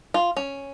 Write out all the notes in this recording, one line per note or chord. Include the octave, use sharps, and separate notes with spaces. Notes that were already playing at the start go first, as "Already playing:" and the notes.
F4
C#4